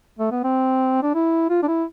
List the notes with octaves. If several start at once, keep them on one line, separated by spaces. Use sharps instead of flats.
A3
B3
C4
D4
E4
F4
D4
E4